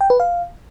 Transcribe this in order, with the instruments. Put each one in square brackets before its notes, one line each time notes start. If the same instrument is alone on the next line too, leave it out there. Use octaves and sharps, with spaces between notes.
[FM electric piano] G5
B4
F5